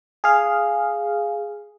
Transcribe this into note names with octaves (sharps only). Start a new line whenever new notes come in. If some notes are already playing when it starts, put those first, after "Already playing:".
G#4 F5